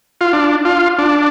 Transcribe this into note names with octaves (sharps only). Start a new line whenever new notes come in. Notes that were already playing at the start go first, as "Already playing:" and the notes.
F4
D4
F4
D4